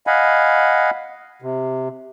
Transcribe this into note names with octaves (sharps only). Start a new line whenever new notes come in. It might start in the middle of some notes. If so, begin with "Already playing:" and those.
D#5 F5 F#5 G#5 B5
C3